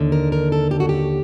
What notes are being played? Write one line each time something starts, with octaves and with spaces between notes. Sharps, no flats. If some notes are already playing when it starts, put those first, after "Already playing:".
Already playing: D#2 D3
A#4
A#4
A4
G4
F#4
G4